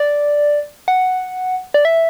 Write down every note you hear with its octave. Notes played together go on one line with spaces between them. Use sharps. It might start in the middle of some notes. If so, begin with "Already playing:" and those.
Already playing: D5
F#5
D5
E5